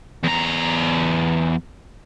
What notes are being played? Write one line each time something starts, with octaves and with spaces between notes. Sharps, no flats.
E2 A#5